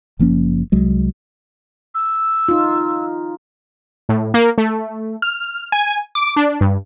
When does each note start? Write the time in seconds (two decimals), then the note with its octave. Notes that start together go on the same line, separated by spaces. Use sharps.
0.19 F#1 F3 A#3 C#4
0.72 C2 F#3 G#3
1.95 E6
2.49 D#4 F4
4.09 A2
4.34 A#3
4.58 A3
5.22 F6
5.72 G#5
6.15 D6
6.36 D4
6.61 G2